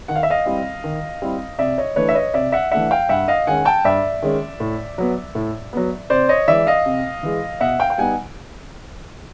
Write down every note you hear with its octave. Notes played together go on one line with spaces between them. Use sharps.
D#3 F#5
F5
E5
D#5 F5
G3 C4 E4
D#3
G3 C4 E4
C3 D5 E5
C#5 D#5
E3 A3 D4 B4 C#5
E5
C#5 D#5
C3 D5 E5
E5 F#5
E3 A3 D4 E5 F#5
F5 G5
G2 E5 F#5
D#5 F5
D#3 G#3 C#4 F#5 G#5
G5 A5
G2 D5 E5
D#3 G#3 C#4
A2
F#3 B3
A2
F#3 B3
C3 C5 D5
C#5 D#5
E3 G#3 D5 E5
D#5 F5
C3
E3 G#3
B2 E5 F#5
F5 G5
G5
G3 B3 D#4 F#5 G#5